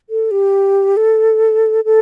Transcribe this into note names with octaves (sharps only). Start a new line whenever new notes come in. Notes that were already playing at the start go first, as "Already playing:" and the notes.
A4
G4
A4
A4